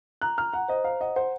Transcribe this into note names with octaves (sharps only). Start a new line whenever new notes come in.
A#5 F#6
A#5 F6
F#5 A#5
C5 D#5
F5 A#5
D#5 F#5
C5 F#5